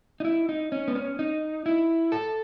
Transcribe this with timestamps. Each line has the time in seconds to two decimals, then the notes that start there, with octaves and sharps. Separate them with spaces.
0.20 D#4
0.25 E4
0.49 D#4
0.72 C#4
0.88 B3
0.95 C#4
1.19 D#4
1.66 E4
2.12 A4